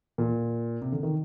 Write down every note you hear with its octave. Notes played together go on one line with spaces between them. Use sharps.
A#2
C3
D3
D#3